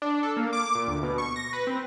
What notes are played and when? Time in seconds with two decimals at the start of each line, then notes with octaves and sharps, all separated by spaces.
0.02 D4
0.23 A4
0.37 A#3
0.53 D6
0.75 A#2
0.88 D2
1.03 B2
1.18 C#6
1.36 A#6
1.53 B4
1.67 C4